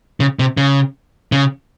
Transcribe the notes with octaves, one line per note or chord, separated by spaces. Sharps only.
C#3
C3
C#3
C#3